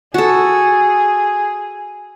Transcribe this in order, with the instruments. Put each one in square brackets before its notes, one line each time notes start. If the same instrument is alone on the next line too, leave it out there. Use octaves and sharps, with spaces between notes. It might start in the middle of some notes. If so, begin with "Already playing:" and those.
[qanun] F#4 A4 [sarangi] G#4